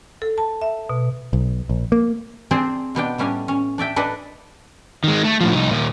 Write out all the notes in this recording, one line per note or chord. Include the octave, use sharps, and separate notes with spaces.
A4
A5
E5
B2
B1
A#1
A#3
C4 D4 G#4 C5 D5 A5
B2 B3 D4 G5
A2 G3 C#4 D4 G#5
C#4
D4 D5 E5 G5
D4 A4 B4 D5 D#5
D#3 G#3
A3
A2 F3
C2 D#4
A#2 D#3